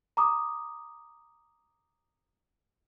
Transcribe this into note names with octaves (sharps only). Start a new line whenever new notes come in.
A#5 D6 D#6